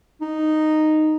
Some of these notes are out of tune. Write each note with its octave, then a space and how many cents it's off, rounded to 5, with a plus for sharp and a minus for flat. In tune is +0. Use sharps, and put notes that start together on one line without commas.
D#4 -5